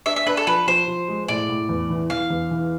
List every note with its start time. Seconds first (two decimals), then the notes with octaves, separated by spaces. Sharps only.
0.06 D4 E5
0.16 E5
0.26 D4 B4
0.37 A4
0.47 F3 B4
0.67 F3 C5
0.88 F3
1.08 G#3
1.28 A2 D5
1.49 A2
1.69 E2
1.90 E3
2.10 E3 F5
2.30 E2
2.51 E3